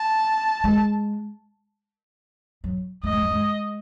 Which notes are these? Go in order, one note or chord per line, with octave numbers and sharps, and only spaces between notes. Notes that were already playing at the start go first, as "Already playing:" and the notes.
Already playing: A5
G#3
F#3
A3 D#5
G#3
F#3
G#3